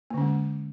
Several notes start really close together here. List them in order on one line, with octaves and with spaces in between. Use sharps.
A#3 D3 C#4 G#3